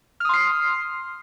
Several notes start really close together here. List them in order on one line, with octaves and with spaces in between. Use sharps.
F6 D#6 C6 C7